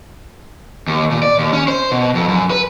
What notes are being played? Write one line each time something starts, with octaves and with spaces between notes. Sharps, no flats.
D#2
A#2
D5
D#2
C#4
C5
B2
F2
F#2
B4